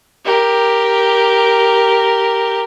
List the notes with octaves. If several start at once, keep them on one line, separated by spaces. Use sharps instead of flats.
G4 A#4